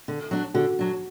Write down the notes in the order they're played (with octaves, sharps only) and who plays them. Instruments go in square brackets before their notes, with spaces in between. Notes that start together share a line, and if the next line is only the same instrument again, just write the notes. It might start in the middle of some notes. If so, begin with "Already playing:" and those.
[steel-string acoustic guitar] D3
F#3 D4
[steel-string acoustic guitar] D3 [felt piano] F#4
[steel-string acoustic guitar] F#3 D4